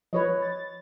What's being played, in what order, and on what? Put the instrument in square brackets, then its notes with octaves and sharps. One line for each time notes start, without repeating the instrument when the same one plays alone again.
[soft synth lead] F3 [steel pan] B4 C#5 D#5
[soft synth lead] A6